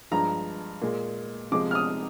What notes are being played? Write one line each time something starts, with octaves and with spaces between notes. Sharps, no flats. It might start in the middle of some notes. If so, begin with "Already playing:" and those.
G2 F3 G#3 A#5
A#2 G#3
C3 F3 G#3 D6
F6
D#6